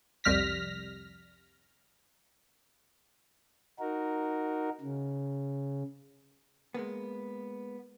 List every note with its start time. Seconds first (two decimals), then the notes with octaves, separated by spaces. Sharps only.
0.24 C2 F2 G3 F6 A#6 B6
3.79 D#4 F#4 A#4
4.81 C#3
6.74 G#3 A#3 B3